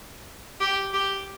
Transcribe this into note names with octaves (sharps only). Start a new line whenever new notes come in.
G4
G4